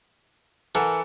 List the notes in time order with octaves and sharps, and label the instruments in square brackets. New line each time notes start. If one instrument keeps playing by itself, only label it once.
[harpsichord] E3 [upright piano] A4 A#4 F#5